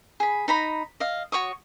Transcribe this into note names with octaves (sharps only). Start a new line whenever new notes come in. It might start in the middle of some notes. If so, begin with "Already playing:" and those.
G#4 B5
D#4 A#5 B5
D#5 F5
F#4 C#5 C#6 D#6